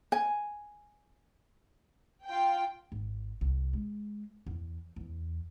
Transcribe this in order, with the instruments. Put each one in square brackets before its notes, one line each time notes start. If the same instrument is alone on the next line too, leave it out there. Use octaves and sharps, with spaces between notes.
[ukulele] G#5
[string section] F4 G5
[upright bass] G#1
C2
G#3
E2
E2